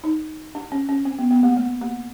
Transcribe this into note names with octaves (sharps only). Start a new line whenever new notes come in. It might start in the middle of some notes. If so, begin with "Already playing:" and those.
D#4
D4
C#4
C#4
C4
B3
B3
A#3
A3
A#3